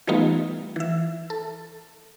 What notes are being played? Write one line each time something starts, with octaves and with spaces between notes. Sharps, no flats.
E3 G3 A3 B3 D#4 F4
E3 E5
A4